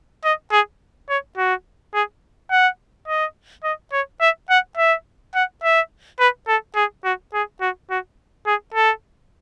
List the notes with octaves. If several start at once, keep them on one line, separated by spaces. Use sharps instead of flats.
D#5
G#4
C#5
F#4
G#4
F#5
D#5
D#5
C#5
E5
F#5
E5
F#5
E5
B4
A4
G#4
F#4
G#4
F#4
F#4
G#4
A4